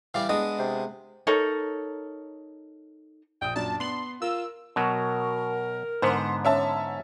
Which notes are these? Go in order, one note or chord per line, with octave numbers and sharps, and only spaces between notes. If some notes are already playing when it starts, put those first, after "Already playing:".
E3 G3 D5 F5
G#3 B3 D4 D#5
C3
D#4 A4 A#4 C#5
A#1 G5 D#6
F#2 A#2 D4 A5
B3 C6 F#7
F4 A#4 E6
B2 F#3 A#4
G#2 D3 B3 C5
C#4 E5 A5